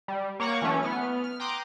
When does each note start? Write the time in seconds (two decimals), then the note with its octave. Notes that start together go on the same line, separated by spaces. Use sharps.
0.08 G3
0.40 A#3 C#5 F#5 C#6 D6
0.62 E3 F#3 A3 C#4
0.83 B3 F6
1.24 F6
1.40 G5 A#5 C6 D6 D#6 F#6